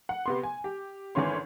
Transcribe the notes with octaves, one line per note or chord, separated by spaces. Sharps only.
F#5
C3 B3 C6
G#5
G4
G#1 D3 E3 C#4 C#5 C6